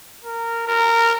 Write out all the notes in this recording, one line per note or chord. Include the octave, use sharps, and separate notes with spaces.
A#4
A#4